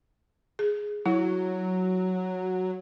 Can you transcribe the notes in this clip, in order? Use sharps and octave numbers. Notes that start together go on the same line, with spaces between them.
G#4
F#3 E4